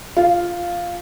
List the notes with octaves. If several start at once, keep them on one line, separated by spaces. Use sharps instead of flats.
F4